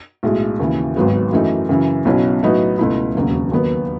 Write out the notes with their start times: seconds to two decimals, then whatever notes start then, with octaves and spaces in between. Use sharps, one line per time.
0.23 B1 A2 G#3
0.60 D#2 C#3 E3
0.96 G#1 G#2 F#3 B3 F#4
1.32 F#2 E3 A3 D#4
1.69 F#2 C#3 E3
2.05 B1 B2 F#3 C#4 E4
2.43 A2 F#3 B3 D#4 F#4
2.79 C#2 B2 A3 E4
3.15 E1 D#2 C#3 F#3
3.52 D#2 D#3 F#3 B3